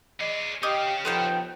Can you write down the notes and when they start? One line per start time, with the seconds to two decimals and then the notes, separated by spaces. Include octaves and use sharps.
0.21 G#4 D5 D#5
0.63 C#4 G4 D#5 F5 D6 D#6 G6
1.05 F3 B3 D#4 A4 G5 C6